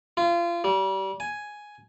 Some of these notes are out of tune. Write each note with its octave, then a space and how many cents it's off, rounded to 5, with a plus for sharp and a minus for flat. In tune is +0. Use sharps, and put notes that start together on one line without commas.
F4 -30
G3 -30
G#5 +5